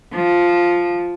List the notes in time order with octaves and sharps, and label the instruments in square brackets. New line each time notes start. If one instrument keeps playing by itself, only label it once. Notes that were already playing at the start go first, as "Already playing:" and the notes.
[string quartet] F3